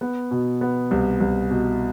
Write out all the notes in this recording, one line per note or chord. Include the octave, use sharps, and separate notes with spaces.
B3
B2
B3
C2
C2
B2